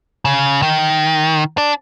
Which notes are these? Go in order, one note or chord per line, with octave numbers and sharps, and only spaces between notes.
C#3
D#3
D4